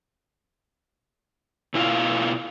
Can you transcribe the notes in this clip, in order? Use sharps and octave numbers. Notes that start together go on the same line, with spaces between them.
B2 E4 F4 F5